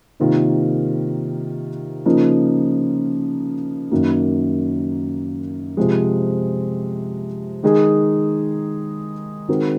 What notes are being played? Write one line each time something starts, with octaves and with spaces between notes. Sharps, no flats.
C3 D#3 A#3 F4
C#3 F3 A#3 D#4
F#2 D#3 F#3 A#3
C3 F3 G#3
D#3 G#3 D#4 G#4
D#3 G#3 C4 F#4 A#4